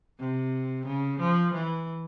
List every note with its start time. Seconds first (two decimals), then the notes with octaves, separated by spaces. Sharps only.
0.19 C3
0.86 C#3
1.20 F3
1.54 E3